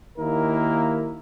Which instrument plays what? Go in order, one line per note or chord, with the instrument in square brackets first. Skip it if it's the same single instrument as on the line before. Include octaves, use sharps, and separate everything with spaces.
[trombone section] D#2 D#3 A#3 E4 A#4